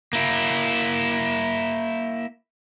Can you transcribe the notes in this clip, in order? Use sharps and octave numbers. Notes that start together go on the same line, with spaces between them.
A#3 E4